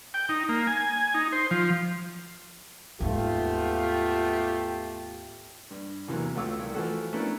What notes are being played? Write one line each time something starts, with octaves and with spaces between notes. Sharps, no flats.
G5
D#4
A#3
G#5
D#4
C5
F3
D#2 G#2 A3 B3 F4 G4
G2
E2 C3 E3 F#3 A#3
C#2 A3 F4 C#5 D6 E6
C2 G5
E3 F3 A3 F#4 A4
A3 B3 C#4 D4 E4 A#4